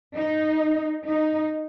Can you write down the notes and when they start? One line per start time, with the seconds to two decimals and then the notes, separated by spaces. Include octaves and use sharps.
0.16 D#4
1.06 D#4